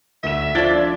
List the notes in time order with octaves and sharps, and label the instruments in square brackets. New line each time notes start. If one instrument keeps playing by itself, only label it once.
[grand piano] D2 E7 [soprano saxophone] E5
[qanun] F3 D5 [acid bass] D4 [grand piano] G#6 A6 G7